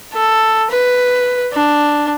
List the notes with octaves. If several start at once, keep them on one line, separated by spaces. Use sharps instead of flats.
A4
B4
D4